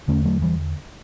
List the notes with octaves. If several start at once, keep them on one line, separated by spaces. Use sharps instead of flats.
E2 D3 A3 C#4
F#3 A3
E3 G3